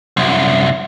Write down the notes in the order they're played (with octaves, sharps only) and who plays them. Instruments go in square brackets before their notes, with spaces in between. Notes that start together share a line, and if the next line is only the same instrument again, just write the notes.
[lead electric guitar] C2 F#2